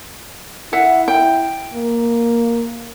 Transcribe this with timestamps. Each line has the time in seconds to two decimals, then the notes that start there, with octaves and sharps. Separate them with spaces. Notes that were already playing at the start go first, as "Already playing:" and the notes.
0.73 E4 E5 F#5
1.08 G5
1.74 A#3